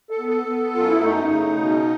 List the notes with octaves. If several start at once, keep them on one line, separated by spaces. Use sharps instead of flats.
A4
B3
A4
B3
F#2 F4
E4
A3 D#4
C#3
B2